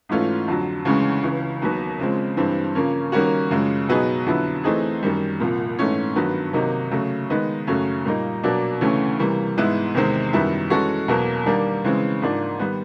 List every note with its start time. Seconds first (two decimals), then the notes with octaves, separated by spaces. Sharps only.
0.09 G#2 E3 A3 C#4 F4
0.48 F2 D3 F#3
0.85 D2 C#3 E3 G#3 C#4
1.23 C#2 C#3 E3
1.62 D#2 D#3 F#3 B3
1.99 C#3 F3 G#3 C4
2.37 G2 E3 G3 C4
2.75 C#3 F3 A#3 C#4
3.12 D#3 G3 A#3 C#4 F#4
3.51 F#2 C#3 F3 G#3
3.89 B2 F#3 B3 D#4 G#4
4.27 F2 D3 F#3 B3 E4
4.64 E3 A3 C4 D#4 G#4
5.03 F#2 D#3 G3
5.40 C2 A#2 F3
5.79 G#2 E3 A3 C#4
6.16 G2 D#3 F#3 B3
6.53 C3 D#3 F#3 A#3 D#4
6.91 C#3 F#3 A3
7.30 D#3 G#3 B3 D#4
7.67 F#2 C#3 F#3 A3 C#4
8.05 A#2 G3 A#3 D#4
8.44 B2 F#3 A#3 D4
8.81 D2 C#3 E3 A3 C#4
9.19 C3 E3 G3 A#3
9.57 G#2 E3 G#3 B3 E4
9.94 E2 C3 D#3 G#3 C4
10.33 F#2 D#3 G3 B3 E4
10.70 E3 G#3 C#4 F#4 A4
11.08 E2 B2 F#3 A#3
11.46 D#3 G3 A#3 D4
11.85 C#3 E3 G#3 C4
12.22 G#2 F3 A#3 D4
12.59 D#3 G3 B3